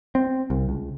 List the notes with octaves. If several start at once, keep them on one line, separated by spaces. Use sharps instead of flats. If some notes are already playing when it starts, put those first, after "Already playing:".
C4
C2
C#2